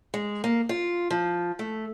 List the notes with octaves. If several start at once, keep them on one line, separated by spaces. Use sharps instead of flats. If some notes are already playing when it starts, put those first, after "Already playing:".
G#3
A#3
F4
F3
A3